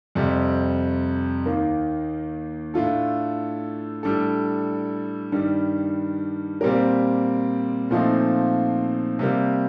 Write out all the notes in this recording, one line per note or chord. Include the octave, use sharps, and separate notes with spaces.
F2 C3 G3
D#2 D#3 A#3
A2 A3 D4 F4 A4
A2 G3 D4 A4
G2 D#3 G3
A#2 G3 C4 G4 A#4
A#2 F3 A3 C4 D#4
C3 G3 A#3